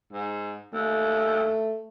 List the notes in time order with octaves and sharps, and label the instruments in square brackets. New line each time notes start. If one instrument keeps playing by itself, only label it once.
[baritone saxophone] G#2
[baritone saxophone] D#2 [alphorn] A3